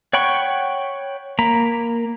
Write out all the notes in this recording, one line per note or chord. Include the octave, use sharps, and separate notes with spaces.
C#5 F#5 G5 B5 C#6
A#3 A#5 B5